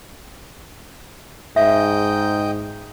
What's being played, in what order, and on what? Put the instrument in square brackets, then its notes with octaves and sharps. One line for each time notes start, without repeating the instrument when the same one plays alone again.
[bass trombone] G#2 [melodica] D#5 G5 [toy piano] E5